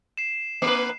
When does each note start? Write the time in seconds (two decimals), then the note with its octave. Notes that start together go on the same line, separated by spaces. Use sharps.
0.17 C7 E7
0.62 A#3 B4 C7